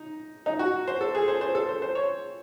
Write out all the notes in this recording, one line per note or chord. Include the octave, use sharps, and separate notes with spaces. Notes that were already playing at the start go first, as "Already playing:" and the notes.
Already playing: D#4
D#4
F#4
C5
A4
G#4
C5
C5
A4
C5
C5
C#5